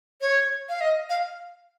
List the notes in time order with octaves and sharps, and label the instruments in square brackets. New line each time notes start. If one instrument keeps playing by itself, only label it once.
[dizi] C#5
F5
D#5
F5